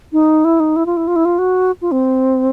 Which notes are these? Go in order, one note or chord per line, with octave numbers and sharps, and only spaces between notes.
D#4
E4
D#4
E4
F4
E4
F4
E4
F4
F#4
F4
C4